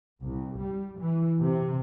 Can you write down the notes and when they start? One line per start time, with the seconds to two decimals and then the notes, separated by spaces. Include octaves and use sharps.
0.24 C2
0.60 G3
1.00 E3
1.41 C3